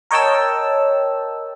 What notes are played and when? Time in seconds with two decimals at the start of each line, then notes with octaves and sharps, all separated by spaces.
0.11 A#4 C#5 D#5 G5 A5 E6